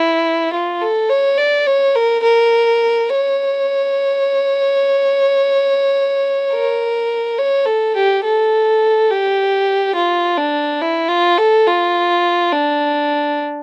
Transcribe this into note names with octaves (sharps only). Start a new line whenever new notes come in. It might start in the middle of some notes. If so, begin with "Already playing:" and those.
Already playing: E4
F4
A4
C#5
D5
C#5
A#4
A#4
C#5
A#4
C#5
A4
G4
A4
G4
F4
D4
E4
F4
A4
F4
D4